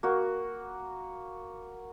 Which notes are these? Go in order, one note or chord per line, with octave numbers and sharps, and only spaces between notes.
A#3 F#4